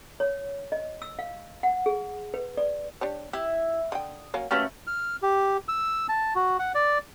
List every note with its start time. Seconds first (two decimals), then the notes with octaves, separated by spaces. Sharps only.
0.20 C#5
0.72 D#5
1.02 E6
1.19 F5
1.63 F#5
1.86 G#4
2.34 B4
2.57 D5
3.01 D4 G4 C#5
3.33 E4 G4
3.92 D3 G5 D#6
4.34 F#3 A#3 C#4
4.51 F#3 A3 A#3 C#4 G4 B4
4.87 F6
5.22 G4
5.68 E6
6.09 A5
6.35 F#4
6.59 F#5
6.75 D5